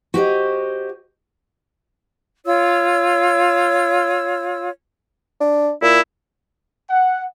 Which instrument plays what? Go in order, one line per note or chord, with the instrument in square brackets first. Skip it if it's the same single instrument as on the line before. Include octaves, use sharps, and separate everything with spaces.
[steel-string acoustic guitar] F#4 G4 C5 D#5
[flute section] F4 C#5 E6
[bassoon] D4
[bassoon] A#2 [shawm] E4
[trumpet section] F#5